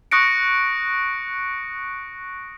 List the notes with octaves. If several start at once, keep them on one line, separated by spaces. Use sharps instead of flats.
C#6 D#6 F#6 A#6 C#7 D7